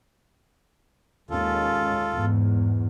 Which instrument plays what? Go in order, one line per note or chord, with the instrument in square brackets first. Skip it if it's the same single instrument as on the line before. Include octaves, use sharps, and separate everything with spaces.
[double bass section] D#2 G#3 C#4 [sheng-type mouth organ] F4 A4
[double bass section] E2 G#2